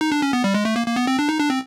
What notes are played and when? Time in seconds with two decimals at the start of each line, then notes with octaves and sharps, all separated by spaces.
0.01 D#4
0.12 D4
0.22 C#4
0.33 B3
0.44 G3
0.54 G#3
0.65 A3
0.76 A#3
0.87 A#3
0.96 B3
1.07 C4
1.19 D4
1.29 D#4
1.39 D4
1.50 C4